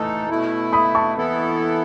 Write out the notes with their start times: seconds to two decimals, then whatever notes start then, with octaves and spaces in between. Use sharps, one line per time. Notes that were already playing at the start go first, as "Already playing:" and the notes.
Already playing: E3 A3 D#4 A4 A5
0.29 B2 A3 E4
0.73 B5 D#6
0.95 A5 C#6
1.17 E3 B3 E4 A4